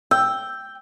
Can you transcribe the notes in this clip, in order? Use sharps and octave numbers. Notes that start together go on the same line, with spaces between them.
G5 E6